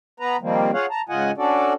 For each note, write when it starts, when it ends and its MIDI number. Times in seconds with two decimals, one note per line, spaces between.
0.20 0.37 59
0.20 0.37 71
0.20 0.37 82
0.41 0.71 51
0.41 0.71 53
0.41 0.71 55
0.41 0.71 58
0.41 0.71 60
0.73 0.86 65
0.73 0.86 68
0.73 0.86 73
0.73 0.86 77
0.73 0.86 78
0.90 1.02 81
0.90 1.02 82
1.09 1.31 44
1.09 1.31 49
1.09 1.31 65
1.09 1.31 75
1.09 1.31 78
1.09 1.31 80
1.37 1.73 61
1.37 1.73 62
1.37 1.73 66
1.37 1.73 69
1.37 1.73 74